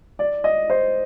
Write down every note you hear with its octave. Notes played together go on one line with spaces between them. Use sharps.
D5
D#5
C5